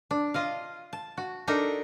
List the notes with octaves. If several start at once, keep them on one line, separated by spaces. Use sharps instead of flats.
D4
F4 D#5 F5
A5
F#4
D4 D#4 A4 A#4 E5 A#5